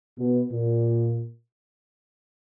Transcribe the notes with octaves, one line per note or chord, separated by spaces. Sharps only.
B2
A#2